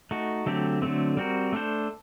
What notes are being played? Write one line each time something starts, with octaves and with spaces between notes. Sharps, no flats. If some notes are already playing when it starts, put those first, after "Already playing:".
A3 D#4 F#4
D3 F#3 A3 C4 G4
D3 F#3 A3 C4
G3 C4 F#4 A#4
A3 D4 A4 C5